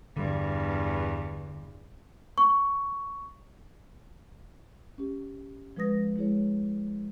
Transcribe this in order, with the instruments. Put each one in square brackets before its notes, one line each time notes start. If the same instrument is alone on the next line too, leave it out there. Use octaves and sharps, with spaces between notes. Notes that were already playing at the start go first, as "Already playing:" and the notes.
[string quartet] E2 G2 [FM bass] D3
[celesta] C#6
[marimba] C#4 G4
F3 G#3 B4 D#6 A#6
G#3 E4 G#4 C#5